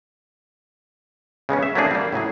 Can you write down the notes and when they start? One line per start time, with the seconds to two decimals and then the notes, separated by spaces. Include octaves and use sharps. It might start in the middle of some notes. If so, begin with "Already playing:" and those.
1.49 C#3 G#3 B3 C#4
1.63 E5
1.75 F#3 A3 A#3 C4 D4 G#4
1.91 G3 A#3
2.13 A2 C#3 F#3 G#4